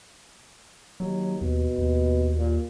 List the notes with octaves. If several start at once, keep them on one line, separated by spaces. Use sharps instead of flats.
D#2 F#3
D#2 B2
D#2
A#2